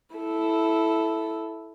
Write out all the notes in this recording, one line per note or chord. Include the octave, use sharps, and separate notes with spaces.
E4 A4